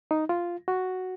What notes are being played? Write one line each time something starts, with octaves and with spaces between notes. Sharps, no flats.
D#4
F4
F#4